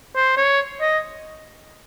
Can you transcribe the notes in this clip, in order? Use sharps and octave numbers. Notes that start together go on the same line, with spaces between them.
C5
C#5
D#5